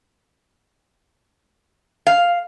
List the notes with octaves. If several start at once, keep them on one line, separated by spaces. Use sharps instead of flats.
F5